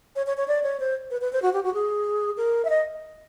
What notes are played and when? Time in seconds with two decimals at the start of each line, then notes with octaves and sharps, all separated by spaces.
0.16 C#5
0.27 C#5
0.37 C#5
0.48 D5
0.63 C#5
0.80 C5
1.11 B4
1.21 B4
1.33 C5
1.42 F#4
1.53 G4
1.64 F#4
1.74 G#4
2.37 A#4
2.65 E5
2.70 D#5